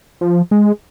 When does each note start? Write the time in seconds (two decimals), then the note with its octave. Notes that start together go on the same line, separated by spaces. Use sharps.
0.21 F3
0.51 G#3